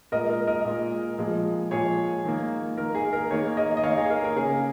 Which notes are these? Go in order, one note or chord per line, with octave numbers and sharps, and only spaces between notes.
A#2 G#3 A#4 D#5
A#4
A#4 D#5
A#2 G#3
A#2 F3 G#3
A#2 F3 G#3 G#4 C#5
D#3 A#3
D#3 A#3 A#4
G#4
A#4
D#3 A#3 G#4 C#5
A#4 D#5
D#5
D#3 A#3 C#5 F5
G#4 C#5
A#4
A#4
C#3 A#3 G#4